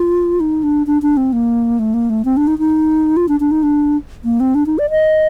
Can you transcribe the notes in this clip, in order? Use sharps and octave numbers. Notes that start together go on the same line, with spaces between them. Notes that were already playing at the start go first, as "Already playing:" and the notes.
Already playing: F4
D#4
D4
D4
D4
C4
A#3
A3
A#3
A3
C4
D4
D#4
D#4
F4
D4
D4
D#4
D4
A#3
C4
D4
D#4
D5
D#5